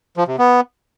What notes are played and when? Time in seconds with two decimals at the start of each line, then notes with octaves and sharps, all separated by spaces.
0.17 F3
0.28 C3
0.38 B3